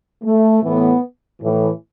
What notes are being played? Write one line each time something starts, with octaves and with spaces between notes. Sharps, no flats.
A3
A2 E3 B3
A2 E3